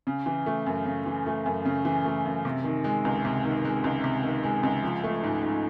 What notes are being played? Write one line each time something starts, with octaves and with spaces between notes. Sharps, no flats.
C#3
E3
A3
F#2
C#3
E3
A3
F#2
C#3
E3
A3
F#2
C3
D#3
G#3
C#2
C3
D#3
G#3
C#2
C3
D#3
G#3
C#2
F3
A3
G#2
G#2